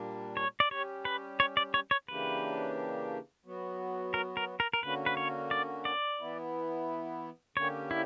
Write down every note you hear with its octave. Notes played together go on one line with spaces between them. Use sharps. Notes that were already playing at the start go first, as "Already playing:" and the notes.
Already playing: A#2 G3 A#3 D4
C#5
D5
G3 C#4 G4 C#5
B4
C#5
D5
C#5
C#5
C#3 E3 A#3 D4 G4 B4
F#3 B3 F#4
A#4
A#4
A#4
A#4
D3 A#3 C#4 F#4 B4
B4
C#5
D5
D5
E3 B3 E4
D3 A#3 C#4 G4 C#5
E4